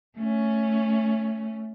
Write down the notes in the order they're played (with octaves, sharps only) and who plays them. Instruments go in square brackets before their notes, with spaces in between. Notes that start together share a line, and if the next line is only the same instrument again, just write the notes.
[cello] A3 C#4